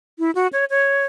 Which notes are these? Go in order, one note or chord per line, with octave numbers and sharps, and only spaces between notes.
E4
F#4
C#5
C#5